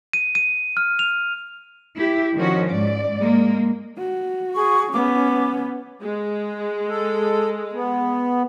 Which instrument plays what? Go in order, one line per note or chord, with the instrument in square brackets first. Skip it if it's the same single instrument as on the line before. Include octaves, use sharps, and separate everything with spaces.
[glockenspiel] D#7
D#7
F6
F7
[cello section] E4 G4
D#3 F3 C#4 F#4
G#2 D5
G#3 A#3
[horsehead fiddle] F#4
[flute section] G#4 C#6
[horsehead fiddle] B3 C#4 [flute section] D6
[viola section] G#3
[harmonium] A4
B3